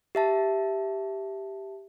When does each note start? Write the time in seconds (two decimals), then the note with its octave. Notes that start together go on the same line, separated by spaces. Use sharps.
0.15 G4 E5 A5